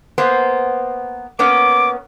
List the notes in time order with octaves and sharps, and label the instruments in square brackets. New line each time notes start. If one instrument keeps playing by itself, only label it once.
[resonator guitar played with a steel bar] A#3 B3 C5
[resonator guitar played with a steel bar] A#3 B3 C#4 [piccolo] D6